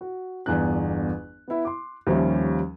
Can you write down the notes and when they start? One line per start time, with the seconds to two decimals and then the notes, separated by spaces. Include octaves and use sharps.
0.01 F#4
0.46 G1 E2 D4 F#6
1.48 B3 E4
1.65 C6 D6
2.07 D#2 F3 G3 C#4 E5